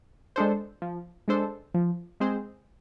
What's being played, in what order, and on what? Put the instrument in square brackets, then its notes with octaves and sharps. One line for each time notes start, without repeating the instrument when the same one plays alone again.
[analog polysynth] G#3 D4 A4 C5
F3
G#3 D4 A4 C5
F3
G#3 C4 G#4 C5